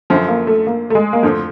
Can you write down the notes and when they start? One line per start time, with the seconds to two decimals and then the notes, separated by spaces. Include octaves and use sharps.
0.10 F#2 D3 F3
0.28 A#3
0.47 A3
0.67 A#3
0.90 A3
0.95 G#3
1.13 A#3
1.23 F2 D3 F3 A3